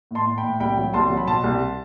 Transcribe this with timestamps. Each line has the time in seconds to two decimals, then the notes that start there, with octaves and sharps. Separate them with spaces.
0.11 A2 A5 C6
0.26 A2
0.38 G5 B5
0.43 A2
0.60 C2 G5 B5
0.77 F#3
0.94 C2 A5 C6
1.10 F#3
1.17 B5
1.27 B2 A5 C6
1.44 C2